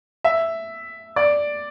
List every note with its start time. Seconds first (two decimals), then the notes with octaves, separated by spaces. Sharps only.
0.24 E5
1.16 D5